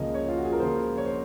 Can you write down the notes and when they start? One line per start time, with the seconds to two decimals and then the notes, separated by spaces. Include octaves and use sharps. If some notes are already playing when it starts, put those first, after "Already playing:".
Already playing: C#2 C#3 F3 A#3 D#5
0.14 C#5
0.29 F4
0.37 F#4
0.45 G#4
0.53 A#4
0.60 C#2 C#3 F3 A#3 C5
0.97 C#5
1.06 C5